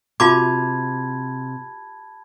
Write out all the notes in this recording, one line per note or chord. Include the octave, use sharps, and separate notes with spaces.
C3 F4 F#4 A5 B5 D6 G#6